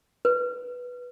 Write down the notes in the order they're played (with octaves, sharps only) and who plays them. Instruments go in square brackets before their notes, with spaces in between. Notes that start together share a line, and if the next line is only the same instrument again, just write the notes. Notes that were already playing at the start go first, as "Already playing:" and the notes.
[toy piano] B4